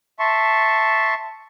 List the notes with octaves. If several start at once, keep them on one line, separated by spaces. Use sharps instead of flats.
E5 A5 C6 C#6